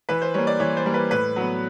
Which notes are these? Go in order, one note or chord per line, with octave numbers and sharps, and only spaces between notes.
E3 B4
C5
G3 A#3 C#5
D5
E3 C#5
C5
G3 A#3
B4
A2 B4
F#3 B3